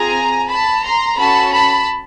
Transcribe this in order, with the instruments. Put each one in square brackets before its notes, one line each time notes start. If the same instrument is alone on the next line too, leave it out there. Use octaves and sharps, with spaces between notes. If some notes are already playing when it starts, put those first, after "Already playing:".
Already playing: [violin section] C4 F4 G#4 G#5 A#5
A5 B5
A#5 C6
C#4 F#4 A4 A5 B5
A5 B5